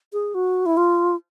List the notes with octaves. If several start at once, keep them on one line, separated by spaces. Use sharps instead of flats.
G#4
F#4
E4
F4